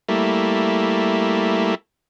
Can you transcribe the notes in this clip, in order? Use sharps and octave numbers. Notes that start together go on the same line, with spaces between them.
G3 A3 A#3 E4